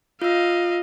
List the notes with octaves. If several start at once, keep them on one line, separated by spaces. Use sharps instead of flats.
F4 D#5 F5 E6